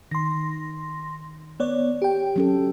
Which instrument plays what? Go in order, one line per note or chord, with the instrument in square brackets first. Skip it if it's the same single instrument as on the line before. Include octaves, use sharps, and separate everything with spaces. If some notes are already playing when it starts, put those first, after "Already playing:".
[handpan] D#3 [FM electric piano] C6 A#6
[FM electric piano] B3 C#5 D5
G4 G5
[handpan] F#3 C#4 A4